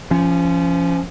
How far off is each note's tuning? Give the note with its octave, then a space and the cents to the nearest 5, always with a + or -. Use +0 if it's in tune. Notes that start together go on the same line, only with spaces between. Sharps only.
F3 -25 C#4 +0